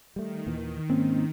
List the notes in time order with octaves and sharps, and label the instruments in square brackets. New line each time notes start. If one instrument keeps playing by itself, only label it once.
[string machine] D#3 [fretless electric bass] G3 A3
[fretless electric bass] D#2 A#2 E3
[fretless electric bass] G#2 [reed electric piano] A#3 C#4 [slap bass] C4